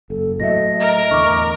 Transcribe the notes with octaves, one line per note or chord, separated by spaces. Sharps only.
F#1 A4
A2 F#3 A3 D#5 E5 A#6
A#4 D#5
E2 A2 D3 C#6 D6